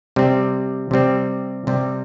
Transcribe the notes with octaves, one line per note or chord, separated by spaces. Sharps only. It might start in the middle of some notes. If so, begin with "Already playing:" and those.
C3 G3 C4
C3 G3 C4
C3 G3 C4